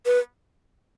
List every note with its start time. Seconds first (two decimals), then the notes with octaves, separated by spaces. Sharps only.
0.06 B4